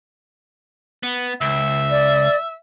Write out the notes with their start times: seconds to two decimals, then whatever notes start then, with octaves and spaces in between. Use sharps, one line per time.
1.03 B3
1.41 C#2 E5
1.91 D5